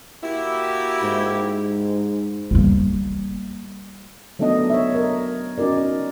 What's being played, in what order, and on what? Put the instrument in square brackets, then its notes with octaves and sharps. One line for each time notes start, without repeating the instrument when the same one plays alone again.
[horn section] A#3 F#4 G4 [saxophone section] E4
[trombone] G#2
[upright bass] G3 A#3
[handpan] F#3 A3 B3 D4 D#4 D#5
C#5 E5
A#4 D#5
C#4 D#4 F#4 A#4 D5